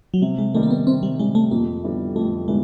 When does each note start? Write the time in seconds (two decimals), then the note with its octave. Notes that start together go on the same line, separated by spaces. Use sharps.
0.14 F#3
0.22 C3 G3
0.38 G#3
0.54 D#3 G3 A3
0.63 A#3
0.71 B3
0.86 C3 C4
1.03 G3
1.19 D#3 G3 G#3
1.35 A3
1.51 F2 A#3
1.83 D3 G3 B3 E4
2.15 F2 A3
2.48 D3 G3 G#3 B3 E4